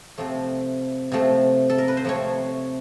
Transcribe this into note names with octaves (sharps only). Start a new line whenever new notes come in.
C3 F3 A3
C3 F3 A3
A4
A#4
B4
C5
C3 F3 A3 C#5